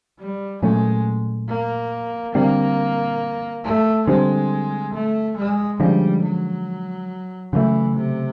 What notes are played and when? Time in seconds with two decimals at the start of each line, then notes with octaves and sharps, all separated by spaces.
0.19 G3
0.62 A#2 F#3 G#3 A3 C#4
1.49 A#3
2.35 D3 G3 A#3 C4
3.64 A3
4.08 D3 G3 G#3 C4
4.94 A3
5.37 G#3
5.80 D3 F3 G3 G#3 C#4
6.23 F#3
7.53 C#3 E3 F#3 A3
7.96 C3